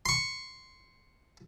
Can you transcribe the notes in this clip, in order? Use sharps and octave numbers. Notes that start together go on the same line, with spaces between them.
C6 C#6